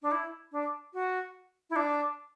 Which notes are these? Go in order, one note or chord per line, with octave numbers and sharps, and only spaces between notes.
D4
E4
D4
F#4
E4
D4